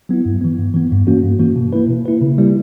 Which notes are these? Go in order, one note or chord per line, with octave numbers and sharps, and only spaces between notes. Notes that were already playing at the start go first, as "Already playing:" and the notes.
F#3 B3 E4
G2
E3 B3
G2
E3 B3
G2
E3 A#3 C#4 F#4
G2
E3 A#3 C#4 F#4
B2
A#3 E4 B4
B2
A#3 E4 B4
C#3
G3 A#3 E4 G4